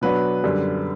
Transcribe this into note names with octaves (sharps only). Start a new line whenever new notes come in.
B2 F#3 B3 D4 B4
F#2 D3 G3